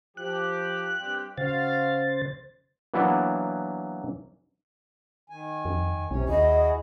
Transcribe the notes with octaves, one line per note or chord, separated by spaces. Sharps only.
F3 G4 F#6
G2 C4 G4
C#3 F#4 C5 F5 A6
E3 F#3 A#3 B3 D4 E4
D#3 G#5
F2
B1 C3 C#4 C#5
D#2 E4 F#4 G#4 D#5